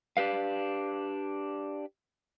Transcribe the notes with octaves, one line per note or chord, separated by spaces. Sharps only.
D4 G4 B4 F5